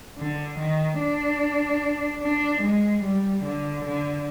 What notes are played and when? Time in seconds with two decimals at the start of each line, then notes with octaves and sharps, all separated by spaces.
0.18 D3
0.59 D#3
1.00 D4
2.22 D4
2.62 G#3
3.03 G3
3.44 D3
3.84 D3